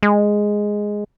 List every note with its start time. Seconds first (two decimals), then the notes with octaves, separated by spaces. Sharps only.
0.03 G#3